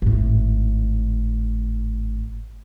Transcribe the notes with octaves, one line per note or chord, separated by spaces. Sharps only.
G#1 A2